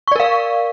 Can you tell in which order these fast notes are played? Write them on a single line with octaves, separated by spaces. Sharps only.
C#6 D5 A#4 F5